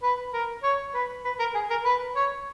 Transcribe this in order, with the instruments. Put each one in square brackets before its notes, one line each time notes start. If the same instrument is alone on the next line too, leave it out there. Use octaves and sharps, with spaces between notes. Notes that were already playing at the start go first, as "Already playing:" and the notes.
[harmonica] B4
A#4
C#5
B4
B4
A#4
G#4
A#4
B4
C#5